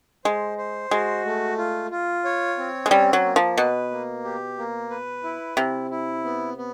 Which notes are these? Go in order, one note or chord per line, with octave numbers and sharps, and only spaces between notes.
G#3 C5
C5
G#3 F#4
A3
F4
F4
C#5
C4
G#3
G3 C#4
F#3
A#3
F3
B2 B4
A#3
G4
A#3
B4
E4
C3 E4
E4
B3
B3